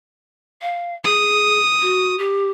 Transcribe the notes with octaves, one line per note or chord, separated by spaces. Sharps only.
F5
G#4 D#6
F#4
G4